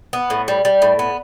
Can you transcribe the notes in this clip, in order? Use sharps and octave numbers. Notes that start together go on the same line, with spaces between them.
B3
A2
G3
G3
A2
B3